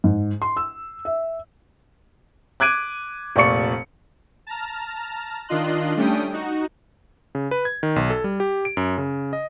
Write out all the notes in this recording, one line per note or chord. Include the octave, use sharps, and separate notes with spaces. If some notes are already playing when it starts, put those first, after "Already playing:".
G#2
C6
E6
E5
D6 F#6 G#6 D7 D#7
F1 A#2 D5 C#6 C#7
A5 A#5 F6
D#3 D4 F4 D#5 C6 F#6
G3 A3 C#4 D4 G5 D#6
D#4 F#4
C#3
B4
G#6
D#3
B1
A4
G3
G4
D7
F#2
C#3
D#5